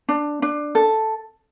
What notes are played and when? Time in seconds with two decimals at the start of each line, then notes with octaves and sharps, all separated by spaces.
0.09 D4
0.42 D4
0.75 A4